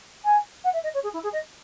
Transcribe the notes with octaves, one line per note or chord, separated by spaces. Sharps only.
G#5
F#5
E5
D#5
C#5
G#4
E4
G#4
D#5